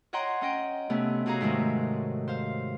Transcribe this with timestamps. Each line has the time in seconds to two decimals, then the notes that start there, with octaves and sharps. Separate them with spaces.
0.13 C#5 D#5 F#5 G5 A#5 C6
0.41 C#4 D#5 G5
0.90 C3 A3 B3 C#4
1.26 C3 F#4 G#4 C#5 F5 A#5
1.41 G#2 D#3 G#3 A3
2.28 C5 F5